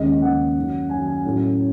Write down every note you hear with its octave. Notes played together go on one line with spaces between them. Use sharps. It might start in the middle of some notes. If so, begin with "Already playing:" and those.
Already playing: D#2 C#3 G#3 C#4 D#5
D#2 C#3 G#3 C#4 F#5
F#2 D#3 F#3 C#4
F#2 D#3 F#3 C#4 G#5
G#5
A2 F#3 C#4